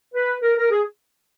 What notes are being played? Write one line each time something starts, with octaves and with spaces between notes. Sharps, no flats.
B4
A#4
A#4
G#4